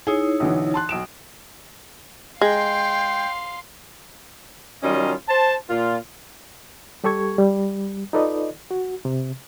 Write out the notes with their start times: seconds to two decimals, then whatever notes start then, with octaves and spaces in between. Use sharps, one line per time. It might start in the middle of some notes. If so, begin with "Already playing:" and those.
0.07 D#4 E4 G#4 C#5
0.40 B1 D3 E3
0.74 A5 C6 F#6
0.89 B1 D7 E7
2.41 G#3 F5 G5 C6
4.83 D#3 F#3 G3 C#4 F4 D#5
5.29 C5 A5
5.70 A#2 F4
7.04 G3 G4 A4 C#6 G#6
7.38 G3
8.13 D#4 F4 A4 B4 D5 D#5
8.71 F#4
9.05 C3